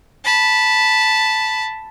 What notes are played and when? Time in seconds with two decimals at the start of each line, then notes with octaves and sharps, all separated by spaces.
0.24 A5 B5